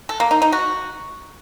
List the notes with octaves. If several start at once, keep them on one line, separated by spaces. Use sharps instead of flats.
A4
A#3
D#4
D#4
F#4